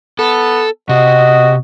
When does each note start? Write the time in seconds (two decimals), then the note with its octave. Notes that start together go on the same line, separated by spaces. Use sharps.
0.19 B3 A4
0.89 C3 F#4 D#5